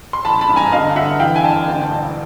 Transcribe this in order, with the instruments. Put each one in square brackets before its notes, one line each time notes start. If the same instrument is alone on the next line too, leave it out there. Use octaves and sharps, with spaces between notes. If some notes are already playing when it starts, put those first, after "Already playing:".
[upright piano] C6
A1 A5 B5
A5 B5
G2
G#5 A#5
D3 D#5 F5
D3 E5 F#5
E3 F5 G5
G#5
G1 G5 A5
D2
E1